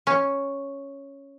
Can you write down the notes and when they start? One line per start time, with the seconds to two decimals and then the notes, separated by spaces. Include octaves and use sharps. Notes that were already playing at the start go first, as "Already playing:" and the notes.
0.07 C#4